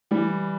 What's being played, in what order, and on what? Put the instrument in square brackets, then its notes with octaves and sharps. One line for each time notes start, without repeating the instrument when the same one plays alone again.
[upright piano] E3 G3